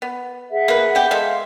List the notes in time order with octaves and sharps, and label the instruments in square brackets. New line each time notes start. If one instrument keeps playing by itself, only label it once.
[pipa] B3
[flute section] G#4 E5 F#5
[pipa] A#3 B4
B3 G4
[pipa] G#3 A4 E5 [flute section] F5 C6